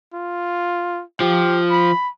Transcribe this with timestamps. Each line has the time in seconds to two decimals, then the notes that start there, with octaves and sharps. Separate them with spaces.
0.14 F4
1.21 F3 G4
1.71 B5